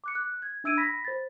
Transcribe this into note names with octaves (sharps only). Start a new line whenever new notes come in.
D6 F#6 C#7
F#6
G#6
D4 E5 E6 G#6 D7 D#7
B5 A#6 B6
C5 A6